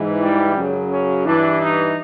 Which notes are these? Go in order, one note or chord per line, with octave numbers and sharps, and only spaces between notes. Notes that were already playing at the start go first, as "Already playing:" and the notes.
Already playing: G#2 E3
G3
F#2 C#3 F#3
C#4
G2 E3 D4
D#4